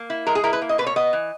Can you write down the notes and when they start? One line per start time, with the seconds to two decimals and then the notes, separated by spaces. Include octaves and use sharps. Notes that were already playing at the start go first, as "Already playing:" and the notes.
Already playing: A#3
0.10 E4
0.27 G#3 A#4
0.35 G#4
0.43 E4 A#4
0.53 B4
0.62 A#3
0.69 D#5
0.78 B2 B4
0.86 C#5
0.96 B3 D#5
1.13 E3